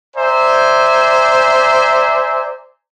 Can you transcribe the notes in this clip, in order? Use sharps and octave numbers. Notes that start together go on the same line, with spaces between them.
C5 D5 E5 G#5 A#5